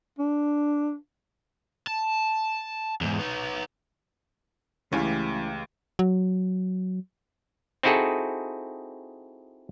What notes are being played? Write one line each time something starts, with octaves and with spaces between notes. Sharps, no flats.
D4
A5
E2 G#2
B3 D#4
C#2 E3 A3 C#4 E4 G4 F5
F#3
C4 D#4 E4 F#4 G#4 A4